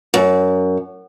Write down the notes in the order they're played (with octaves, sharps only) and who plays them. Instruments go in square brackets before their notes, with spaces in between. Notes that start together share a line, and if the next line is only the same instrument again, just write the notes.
[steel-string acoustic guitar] F#2